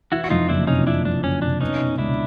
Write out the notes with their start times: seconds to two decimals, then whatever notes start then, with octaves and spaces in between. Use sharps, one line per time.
0.12 E3 E4 F#4
0.24 F#4
0.30 F2 D#4 F4
0.49 F#1 D4 E4
0.67 C3 C#4 D#4
0.86 E3 D4 E4
1.05 F2 D4
1.24 F#1 C#4
1.42 C3 D4
1.61 B3 C#4 D#4
1.80 B2
1.98 C#2 D4 E4